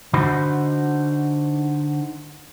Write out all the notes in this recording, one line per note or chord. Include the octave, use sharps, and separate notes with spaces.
D3 D#4 F#4 C5 B5